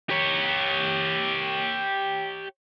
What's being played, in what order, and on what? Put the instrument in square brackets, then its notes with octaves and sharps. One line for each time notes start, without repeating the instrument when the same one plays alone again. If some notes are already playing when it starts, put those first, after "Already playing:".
[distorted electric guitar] G4 C#5